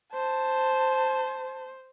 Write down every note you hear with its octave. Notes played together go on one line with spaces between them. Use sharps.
C5 A5